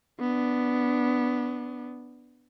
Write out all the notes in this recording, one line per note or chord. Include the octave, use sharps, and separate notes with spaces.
B3 D4